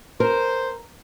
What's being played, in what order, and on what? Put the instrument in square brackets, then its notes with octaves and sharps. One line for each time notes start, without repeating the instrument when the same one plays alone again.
[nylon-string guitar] A#4 [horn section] C5